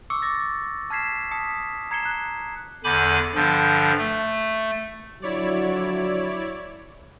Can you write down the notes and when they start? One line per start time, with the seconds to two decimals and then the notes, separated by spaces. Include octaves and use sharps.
0.10 C#6 D6 E6 C#7
0.22 D6 A6 A#6
0.90 A5 F6 G#6 B6 C7 E7
1.31 A5 D#6 B6 C#7
1.91 A#5 G#6 C7 C#7 E7 G7
2.05 F#6
2.84 E2 D3 G#5 B5 D6 G6
3.34 G2 D3 F3
3.98 A3
5.22 D3 F3 F#3 E4 C#5 D5